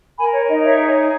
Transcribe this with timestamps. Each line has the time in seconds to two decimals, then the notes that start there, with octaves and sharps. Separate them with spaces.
0.18 A#4 G#5 B5
0.33 C#5
0.48 D#4 D#5
0.63 C#5 E5
0.78 G#4